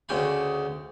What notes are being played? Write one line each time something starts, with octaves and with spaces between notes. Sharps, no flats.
D2 C#3 G5 G#5 B5